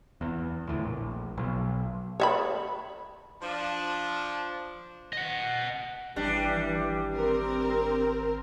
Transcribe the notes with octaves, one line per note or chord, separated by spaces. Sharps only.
E2
D2 A2
A#1
B1
C#5 E5 B5
F3 D4
D#5 F#5
G#1 E3 G3 D4
C4 A#4